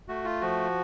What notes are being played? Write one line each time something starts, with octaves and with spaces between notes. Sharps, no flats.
A3 F#4
F4
F3 F#4